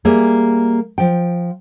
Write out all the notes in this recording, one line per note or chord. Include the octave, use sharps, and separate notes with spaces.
G3 A#3 G#4 E5
F3 G5